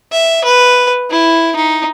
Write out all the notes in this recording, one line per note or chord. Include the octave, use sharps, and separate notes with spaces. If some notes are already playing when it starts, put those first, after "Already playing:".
E5
B4
E4
D#4